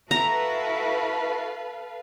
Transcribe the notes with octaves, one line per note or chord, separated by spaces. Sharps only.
E4 F#4 A4 B4 F5 A#5